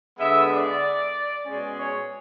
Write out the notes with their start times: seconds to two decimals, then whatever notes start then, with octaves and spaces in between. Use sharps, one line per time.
0.18 D3 G#3 B3 E5
0.50 D5
1.45 B2 G#3 C#4
1.76 C#5